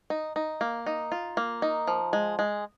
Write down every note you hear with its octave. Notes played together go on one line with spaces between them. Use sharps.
D#4
D#4
A#3
D#4
F4
A#3
D#4
F3
G#3
G#3